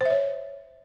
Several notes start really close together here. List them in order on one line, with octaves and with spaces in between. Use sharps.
C5 E5 C#5